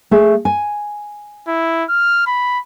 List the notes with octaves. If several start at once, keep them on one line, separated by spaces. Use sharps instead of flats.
A3 G#4
G#5
E4
F6
B5